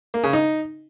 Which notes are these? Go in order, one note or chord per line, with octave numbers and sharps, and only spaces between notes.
A#3
C#3
D#4